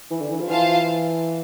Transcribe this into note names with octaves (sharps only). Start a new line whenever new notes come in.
E3
D3
E3
F3
E3 F4 C5 F5 A5